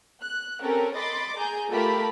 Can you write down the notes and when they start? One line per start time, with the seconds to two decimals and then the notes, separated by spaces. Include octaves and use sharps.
0.21 F#6
0.62 C4 C#4 G4 A4 A#4
0.94 D#5 B5 C6 D6 A6
1.37 G#4 G#5 A#5 G6
1.71 A3 F4 G4 A#4 A5 B5